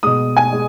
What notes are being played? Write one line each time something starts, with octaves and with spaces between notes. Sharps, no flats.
B2 G#3 D#6
G#5
G#3